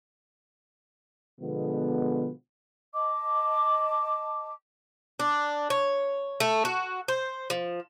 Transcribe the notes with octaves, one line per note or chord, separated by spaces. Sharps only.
B2 D3 F3 G#3 B3
D#5 A5 D6
D4
C#5
A3
F#4
C5
F3